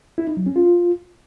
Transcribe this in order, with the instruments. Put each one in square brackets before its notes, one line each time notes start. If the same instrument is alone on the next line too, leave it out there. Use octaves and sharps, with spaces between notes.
[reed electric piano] E4
D#4
F#3
C#4
F4